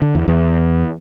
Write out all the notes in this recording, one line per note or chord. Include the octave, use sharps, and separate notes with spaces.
D3
E2
E2